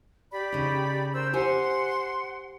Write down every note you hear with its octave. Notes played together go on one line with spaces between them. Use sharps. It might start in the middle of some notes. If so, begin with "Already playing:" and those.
G4 D5 B5
C#3 D#4
A#4 C5 E6
G4 C5 F#5 G#5 C6